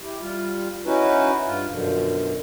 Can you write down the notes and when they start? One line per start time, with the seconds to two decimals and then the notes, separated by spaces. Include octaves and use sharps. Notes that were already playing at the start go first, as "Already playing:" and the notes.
0.01 E4 G4
0.20 G3 F4
0.86 C#4 D#4 E4 F#4 B4
1.46 G2 F4
1.69 F#2 B2 D3 F3